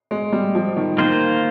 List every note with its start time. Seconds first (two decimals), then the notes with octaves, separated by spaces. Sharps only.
0.11 G#3
0.33 G3
0.55 F3
0.77 D#3
0.98 D#3 A#3 F4 C5